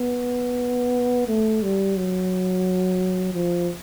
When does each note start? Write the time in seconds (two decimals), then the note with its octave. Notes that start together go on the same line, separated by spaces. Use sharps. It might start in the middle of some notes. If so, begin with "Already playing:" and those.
Already playing: B3
1.28 A3
1.63 G3
1.97 F#3
3.34 F3